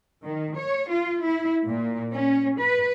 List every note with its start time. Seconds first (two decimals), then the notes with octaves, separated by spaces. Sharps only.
0.24 D#3
0.57 C#5
0.90 F4
1.22 E4
1.65 A#2
2.12 C#4
2.58 B4